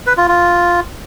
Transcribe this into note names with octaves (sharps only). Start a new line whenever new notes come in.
B4
F4
F4